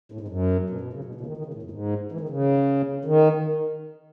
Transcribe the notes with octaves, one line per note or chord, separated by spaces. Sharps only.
A2
G#2
F#2
B2
B2
C#3
B2
B2
C#3
D#3
D#3
C#3
A2
F#2
G#2
E3
D#3
C#3
D#3